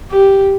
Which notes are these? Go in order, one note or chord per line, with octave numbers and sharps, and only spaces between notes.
G4